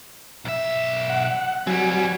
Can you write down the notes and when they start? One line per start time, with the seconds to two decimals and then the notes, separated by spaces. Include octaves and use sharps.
0.45 B1 E5
1.10 F#5
1.67 F#3 G3 C4 G#5